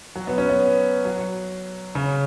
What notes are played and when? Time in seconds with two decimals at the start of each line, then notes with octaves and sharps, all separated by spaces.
0.15 F#3
0.27 B3
0.38 C#4
0.49 B3
1.05 F#3
1.95 C#3